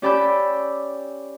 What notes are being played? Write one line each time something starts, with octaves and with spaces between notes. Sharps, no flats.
C#4 G4 D5 B5 E6 G6